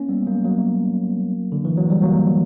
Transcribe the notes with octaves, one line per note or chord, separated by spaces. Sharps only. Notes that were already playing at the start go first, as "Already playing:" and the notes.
Already playing: A#3 C#4
G3 B3
F#3 A#3
F#3 A#3
D3
E3
F#3
G3
F#3 A#3